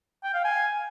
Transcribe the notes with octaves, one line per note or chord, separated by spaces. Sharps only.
G5
F5
G#5